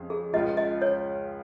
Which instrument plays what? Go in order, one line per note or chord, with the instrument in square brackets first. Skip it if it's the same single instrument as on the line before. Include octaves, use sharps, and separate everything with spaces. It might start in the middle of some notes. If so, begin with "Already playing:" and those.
Already playing: [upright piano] F2 C#3 G#3
[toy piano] G#4
[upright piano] C#2 C#3 G#3 F4 [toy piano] D#5
[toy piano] D#5
C#5